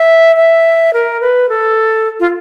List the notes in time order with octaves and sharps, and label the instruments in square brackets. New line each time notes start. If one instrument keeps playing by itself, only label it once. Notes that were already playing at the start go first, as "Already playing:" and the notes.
Already playing: [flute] E5
E5
A#4
B4
A4
F4